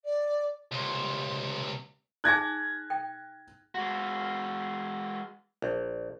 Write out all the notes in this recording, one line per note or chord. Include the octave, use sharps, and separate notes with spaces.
D5
C#2 C3
D#4 G#4 G#5 F#6 G#6 A#6
G5
G#3 F#4
A#1